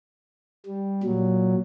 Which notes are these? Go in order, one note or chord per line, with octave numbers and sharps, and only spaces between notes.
G3
A#2 F#3